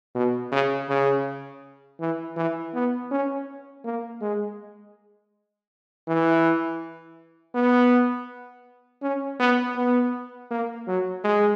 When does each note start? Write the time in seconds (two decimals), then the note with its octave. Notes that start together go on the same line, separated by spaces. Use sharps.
0.15 B2
0.52 C#3
0.89 C#3
2.00 E3
2.36 E3
2.74 B3
3.11 C#4
3.85 A#3
4.22 G#3
6.07 E3
7.55 B3
9.03 C#4
9.40 B3
9.77 B3
10.51 A#3
10.88 F#3
11.24 G#3